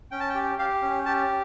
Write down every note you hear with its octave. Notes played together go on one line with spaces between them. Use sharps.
C#4 G5
A5
G5
G4
G4 F5
C#4
G4 A5